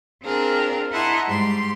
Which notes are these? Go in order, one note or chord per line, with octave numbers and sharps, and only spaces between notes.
C4 D4 F4 G#4 A#4
E4 D#5 F#5 A5 A#5 C6
G#2 G3 C6